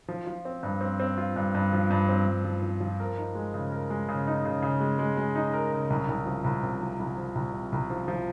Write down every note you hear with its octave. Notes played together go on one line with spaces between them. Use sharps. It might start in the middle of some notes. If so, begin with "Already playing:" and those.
F3
F3
C4
G2
C4
C4
F4
G2
G2
F3
G2
C4
G2
F3
F3
F3
A#4
D#4
G#3
C#3
A#4
G#3
C#3
D#4
C#3
C#3
G#3
G#3
G#3
D#4
A#4
C#3
C2
C2
F3
C2
C3
F3
C2
F3
C2
C3
C2
F3
F3